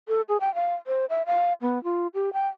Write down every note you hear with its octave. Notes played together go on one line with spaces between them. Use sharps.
A4
G#4
G5
F5
C5
E5
F5
B3
F4
G4
G5